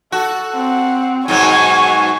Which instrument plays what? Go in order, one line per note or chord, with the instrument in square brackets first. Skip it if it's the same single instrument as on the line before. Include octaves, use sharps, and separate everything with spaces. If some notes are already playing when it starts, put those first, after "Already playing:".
[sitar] F#4 [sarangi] A4
[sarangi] C4 [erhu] F#5
[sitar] G#2 B2 F#3 [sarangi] G#5 [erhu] C#6